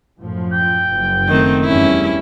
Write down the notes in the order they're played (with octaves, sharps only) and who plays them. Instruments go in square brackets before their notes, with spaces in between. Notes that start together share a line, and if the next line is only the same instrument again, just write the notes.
[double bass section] F#2 A2 F3
[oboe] G5
[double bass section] F#1 F#2
[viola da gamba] D#3 A3 C4
[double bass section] E2 G2 G3 [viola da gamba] C#4 E4